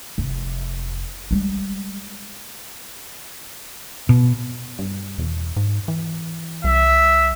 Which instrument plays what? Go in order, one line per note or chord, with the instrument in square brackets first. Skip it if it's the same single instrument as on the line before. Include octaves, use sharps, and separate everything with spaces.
[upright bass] F1
G3 G#3
[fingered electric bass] B2
[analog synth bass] G2
E1
G#2
E3
[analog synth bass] C2 [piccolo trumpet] E5